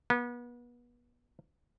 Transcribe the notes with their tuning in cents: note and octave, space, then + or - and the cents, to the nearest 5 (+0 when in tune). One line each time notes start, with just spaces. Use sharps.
B3 -35